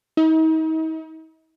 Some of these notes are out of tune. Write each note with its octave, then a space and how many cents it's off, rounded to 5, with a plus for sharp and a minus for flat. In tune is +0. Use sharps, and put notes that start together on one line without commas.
D#4 +40